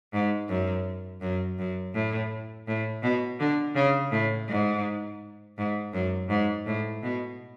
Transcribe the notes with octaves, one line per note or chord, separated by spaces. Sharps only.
G#2
F#2
F#2
F#2
A2
A2
B2
D3
C#3
A2
G#2
G#2
F#2
G#2
A2
B2